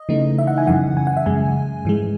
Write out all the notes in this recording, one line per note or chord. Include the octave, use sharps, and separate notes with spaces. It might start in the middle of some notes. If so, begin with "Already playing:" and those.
Already playing: D#5
C#3 E3 A3 D#4
E5
F#5
G#5
F#2 C#3 E3 F#5
G#5
F#5
E5
F#2 C#3 G#3 G#5
G#2 E3 G#3